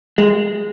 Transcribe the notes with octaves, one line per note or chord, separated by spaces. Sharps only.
G#3